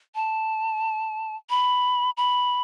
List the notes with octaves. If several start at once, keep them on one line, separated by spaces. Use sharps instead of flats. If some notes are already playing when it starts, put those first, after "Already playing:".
A5
B5
B5